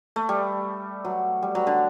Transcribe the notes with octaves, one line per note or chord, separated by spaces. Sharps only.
A3
G3
F#3
G3
F#3
D3